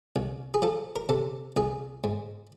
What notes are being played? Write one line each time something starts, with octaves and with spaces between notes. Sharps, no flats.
C2
G#4
F3 A4
A#4
C3 A4
C2 G#4
G#2